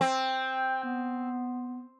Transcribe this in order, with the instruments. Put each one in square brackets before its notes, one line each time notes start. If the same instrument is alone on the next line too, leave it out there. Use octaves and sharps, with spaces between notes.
[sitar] C4 [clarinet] G5
[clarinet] B3